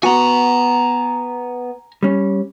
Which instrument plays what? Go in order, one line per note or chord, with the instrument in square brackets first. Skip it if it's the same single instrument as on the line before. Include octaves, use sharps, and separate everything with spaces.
[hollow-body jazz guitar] B3 F#4 [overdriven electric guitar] G#5 A#5
[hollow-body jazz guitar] G3 C#4